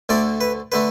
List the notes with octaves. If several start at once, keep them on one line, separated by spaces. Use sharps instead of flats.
D2 D3 A3 D5
B4
D3 A3 B4